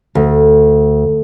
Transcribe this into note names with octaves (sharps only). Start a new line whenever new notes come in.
D2